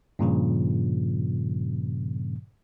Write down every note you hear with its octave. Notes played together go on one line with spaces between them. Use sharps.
G2 A#2 C#3 F3